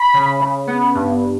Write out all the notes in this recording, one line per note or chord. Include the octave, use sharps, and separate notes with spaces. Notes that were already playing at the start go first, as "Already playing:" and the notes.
Already playing: B5
C#3
C#3
B3
G2